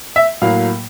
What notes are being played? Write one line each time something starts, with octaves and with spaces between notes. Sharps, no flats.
E5
A2 F#3 A#3 F5